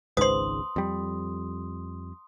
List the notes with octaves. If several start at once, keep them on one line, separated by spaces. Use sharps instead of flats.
G#1 C#2 G#2 B4 C5 C6 D#6
F2 G3